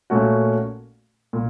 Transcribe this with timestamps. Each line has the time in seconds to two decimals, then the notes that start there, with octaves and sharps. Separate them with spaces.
0.10 A#2 A3 C#4 F#4
1.33 A#2